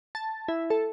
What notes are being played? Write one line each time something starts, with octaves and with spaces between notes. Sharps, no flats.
A5
E4
A4